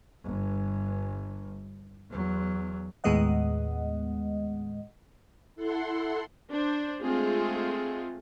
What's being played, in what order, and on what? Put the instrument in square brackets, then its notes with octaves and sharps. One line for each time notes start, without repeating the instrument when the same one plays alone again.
[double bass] G1 G2
E2 F#3
[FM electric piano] D#2 A2 G#3 B3 D#5 F#5
[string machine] E4 A4 F#5 C6
[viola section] D4 C5
G#3 A3 C4 F4 G#4